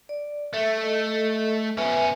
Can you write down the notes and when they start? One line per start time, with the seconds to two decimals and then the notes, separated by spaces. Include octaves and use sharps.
0.09 D5
0.54 A3 E5
0.78 A4 D#5
1.77 B2 C#4 B4 E5 G#5